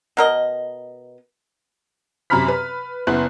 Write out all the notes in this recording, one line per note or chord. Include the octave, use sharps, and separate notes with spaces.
B2 A#4 D#5
F#2 C3 A#5 B5 F6 B6
B4
F#1 B3 E4 F#6